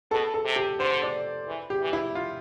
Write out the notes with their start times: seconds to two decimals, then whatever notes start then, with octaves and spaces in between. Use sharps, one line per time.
0.11 B2 A4
0.34 A4
0.45 C3
0.56 G4
0.79 D3 C5
1.02 D5
1.47 E3
1.70 G4
1.81 E3
1.93 E4
2.15 F4